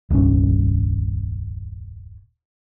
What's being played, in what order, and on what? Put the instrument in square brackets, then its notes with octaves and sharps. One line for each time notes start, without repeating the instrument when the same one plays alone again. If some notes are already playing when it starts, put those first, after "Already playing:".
[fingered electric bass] D#1 C2 G2 C#4